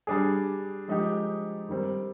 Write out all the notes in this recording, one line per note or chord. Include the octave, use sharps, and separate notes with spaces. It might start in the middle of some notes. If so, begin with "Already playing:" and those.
G3 D4 G#4
F3 G#3 D#4 G4
D#3 G3 C4